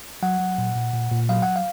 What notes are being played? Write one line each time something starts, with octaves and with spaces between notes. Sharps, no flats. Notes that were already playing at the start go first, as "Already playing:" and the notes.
F#3 F#5
F#3
A#2
A#2
A#2
A#2
F#3 F5
F#3 F#5
F5